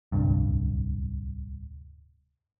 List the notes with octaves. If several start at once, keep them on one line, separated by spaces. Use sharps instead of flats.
D1 C2 G2